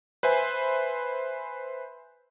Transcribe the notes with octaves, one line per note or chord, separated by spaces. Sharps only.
B4 C5 E5 G#5